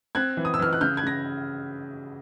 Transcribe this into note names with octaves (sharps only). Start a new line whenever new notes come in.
C4 F#6 G#6
E3
D#6
E6
E3 F6
F#6
C#3 F6 G6
F#6 G#6
C#3 A#6